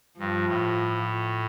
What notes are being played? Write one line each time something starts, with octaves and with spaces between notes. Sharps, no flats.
G2 F3
A2